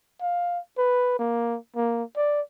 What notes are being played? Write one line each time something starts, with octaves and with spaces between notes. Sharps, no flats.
F5
B4
A#3
A#3
D5